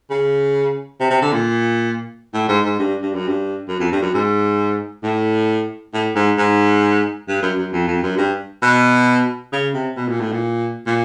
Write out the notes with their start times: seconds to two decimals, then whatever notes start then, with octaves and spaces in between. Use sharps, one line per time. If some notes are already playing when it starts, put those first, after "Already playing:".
0.10 C#3
1.00 C3
1.10 C3
1.22 D3
1.33 A#2
2.34 A2
2.49 G#2
2.65 G#2
2.79 G2
3.02 G2
3.14 F#2
3.27 G2
3.69 F#2
3.80 F2
3.92 G2
4.02 F#2
4.14 G#2
5.03 A2
5.94 A2
6.15 G#2
6.38 G#2
7.28 G2
7.42 F#2
7.58 F#2
7.73 F2
7.88 F2
8.03 F#2
8.17 G2
8.62 B2
9.53 C#3
9.74 C3
9.97 B2
10.09 A#2
10.21 A2
10.32 A#2
10.87 A#2